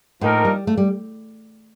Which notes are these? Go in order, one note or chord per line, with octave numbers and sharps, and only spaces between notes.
A2 F3 A#3 D#4 A#4
G3
A3
G3